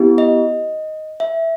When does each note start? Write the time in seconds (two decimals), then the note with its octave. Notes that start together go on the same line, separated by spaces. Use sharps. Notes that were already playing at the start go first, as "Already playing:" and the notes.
Already playing: B3 E4 G4
0.18 D#5
1.20 E5